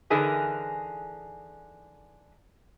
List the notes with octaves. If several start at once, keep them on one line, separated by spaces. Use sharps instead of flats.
D3 E3 D#4 G#4 A#4 B4